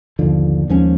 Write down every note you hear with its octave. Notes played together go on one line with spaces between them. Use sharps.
G1 D#2 D3 F3
D#2 F3 G#3 C#4